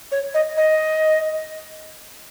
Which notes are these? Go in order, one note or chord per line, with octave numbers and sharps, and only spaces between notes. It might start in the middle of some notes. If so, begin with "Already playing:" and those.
C#5
D#5
D#5